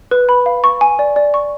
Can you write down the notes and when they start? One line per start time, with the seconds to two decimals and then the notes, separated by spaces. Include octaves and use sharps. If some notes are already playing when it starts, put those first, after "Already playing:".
0.11 B4
0.29 B5
0.46 F5
0.64 C#6
0.81 G#5
0.99 D5
1.16 D5
1.34 C#6